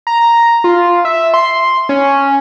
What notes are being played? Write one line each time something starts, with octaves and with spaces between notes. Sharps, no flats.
A#5
F4
E5
C6
C#4